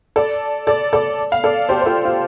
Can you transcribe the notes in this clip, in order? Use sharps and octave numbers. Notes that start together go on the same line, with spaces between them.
A4 D5
A4 D5
A4 D5
F5
A4 D5
G4 C5
C5
F4 A4
F4